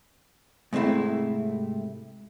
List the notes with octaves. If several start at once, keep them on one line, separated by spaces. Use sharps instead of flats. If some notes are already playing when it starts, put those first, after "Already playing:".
G#2 C3 A3 C4 E4